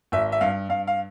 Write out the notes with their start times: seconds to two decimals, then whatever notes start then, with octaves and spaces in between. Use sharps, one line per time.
0.12 G#1 E5
0.32 E5
0.41 G2 F5
0.69 G2 F5
0.87 F5